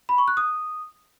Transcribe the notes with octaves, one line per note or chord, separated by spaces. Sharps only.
B5
C#6
F#6
D#6